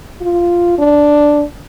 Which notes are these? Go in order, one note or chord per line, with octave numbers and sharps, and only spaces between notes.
F4
D4